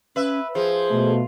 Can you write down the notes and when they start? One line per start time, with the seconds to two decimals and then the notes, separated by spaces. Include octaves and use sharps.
0.16 C#4 B4 E5
0.55 F3 G#4 C5
0.91 B2 A3